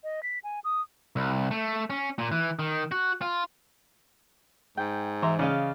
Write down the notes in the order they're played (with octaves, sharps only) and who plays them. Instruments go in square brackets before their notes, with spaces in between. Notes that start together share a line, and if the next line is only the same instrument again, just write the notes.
[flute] D#5
B6
G#5
D#6
[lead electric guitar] C2
A3
C#4
A#2
E3
D#3
F#4
F4
[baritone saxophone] G#2 [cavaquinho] G5
[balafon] E3 [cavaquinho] E5 A#5 C6
[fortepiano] C#3 [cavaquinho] D5 D#5 F5